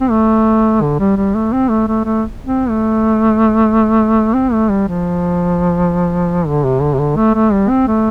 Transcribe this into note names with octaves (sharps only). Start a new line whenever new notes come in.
C4
A3
D3
G3
G3
A3
C4
A3
A3
A3
C4
A3
C4
A3
G3
F3
D3
C3
D3
C3
D3
A3
A3
G3
C4
A3